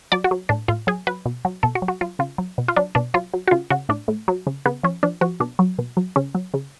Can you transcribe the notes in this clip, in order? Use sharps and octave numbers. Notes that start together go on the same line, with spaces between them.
F#3 D5
F#4
F#3
A2 D4
A2 F4
F#3 G#4
F#3 B4
B2
F#3
B2 A4
F#4
F#3
F#4
F#3 F4
C#3 F4
F#3
B2
F4
F#3 D4
B2 D4
F#3 F4
F#3
F#4
C#3 F4
C#3 F#4
A2 D4
A2
F#3
C#3
C#3 B3
F3 C#4
F3 D4
F3 F#4
B2 D4
F#3
B2
F#3
C#3 C#4
F#3
C#3